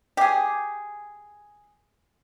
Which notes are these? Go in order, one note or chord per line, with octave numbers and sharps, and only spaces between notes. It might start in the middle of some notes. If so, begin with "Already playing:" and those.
G4 G#4